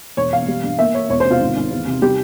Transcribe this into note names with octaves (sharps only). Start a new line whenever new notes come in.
E1 C#5
E1 F5
G3
G2
A#3 E5
A#3 C#5
E1 C#5
C5
C3 F4
G#1
G#1
E2
C3
G3 G4